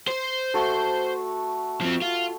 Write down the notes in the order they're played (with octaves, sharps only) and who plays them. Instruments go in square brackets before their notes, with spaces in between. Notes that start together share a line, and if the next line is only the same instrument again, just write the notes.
[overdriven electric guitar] C5
[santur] A3 F#4 A4
[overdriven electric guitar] F3 C4
F4